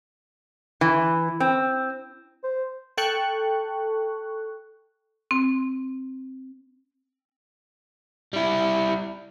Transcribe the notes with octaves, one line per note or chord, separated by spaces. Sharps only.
E3
C4
C5
A4 G5 A5 C#6 F#6
C4
G3 E4